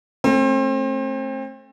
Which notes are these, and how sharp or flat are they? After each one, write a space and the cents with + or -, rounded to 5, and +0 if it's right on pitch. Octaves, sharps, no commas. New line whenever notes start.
A3 +0 C4 +35